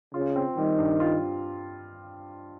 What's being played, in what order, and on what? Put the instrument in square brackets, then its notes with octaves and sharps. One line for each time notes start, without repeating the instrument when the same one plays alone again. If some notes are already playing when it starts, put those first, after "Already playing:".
[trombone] C#3 [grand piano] F4
[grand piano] C4
[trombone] D#3 [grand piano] G3
[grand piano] G2
F4